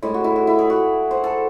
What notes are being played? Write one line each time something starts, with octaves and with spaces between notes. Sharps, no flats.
A2 G#3 E4
F#4
E4
F#4
E4
G#4
F#4
C5
A4